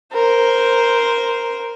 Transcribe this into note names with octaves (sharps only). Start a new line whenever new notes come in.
A#4 C5